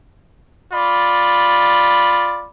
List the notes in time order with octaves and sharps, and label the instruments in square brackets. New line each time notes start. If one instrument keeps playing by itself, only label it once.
[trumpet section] F4 D5 B5